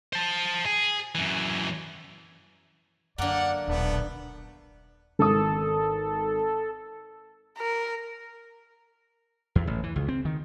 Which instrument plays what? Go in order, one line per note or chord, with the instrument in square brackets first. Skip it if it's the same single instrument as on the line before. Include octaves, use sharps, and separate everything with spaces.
[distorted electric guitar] C5 A5
G#4
F#2 E3
[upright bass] F#2 [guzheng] D3 A#3 [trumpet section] D5 F#5
[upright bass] D#1 B1 [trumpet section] A3 B3 D4
[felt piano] G#1 D#6 [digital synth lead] A4
[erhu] A#4
[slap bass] E2
A1
E3
C#2
C4
D#3